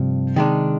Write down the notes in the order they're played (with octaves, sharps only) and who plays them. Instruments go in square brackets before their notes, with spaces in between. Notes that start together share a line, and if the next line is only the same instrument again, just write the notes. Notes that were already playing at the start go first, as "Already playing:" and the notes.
Already playing: [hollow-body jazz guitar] G2 F3 [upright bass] C3
[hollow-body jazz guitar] D#3 G#3 D4